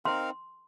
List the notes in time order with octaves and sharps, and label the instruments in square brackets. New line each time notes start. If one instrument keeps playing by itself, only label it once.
[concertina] C4 D#4 A#4 F5 [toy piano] C6